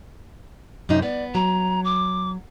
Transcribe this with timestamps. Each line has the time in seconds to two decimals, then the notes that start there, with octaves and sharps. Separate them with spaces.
0.89 F#2 C3 D#4
1.02 B3 D5
1.35 F#3 A#5
1.84 D6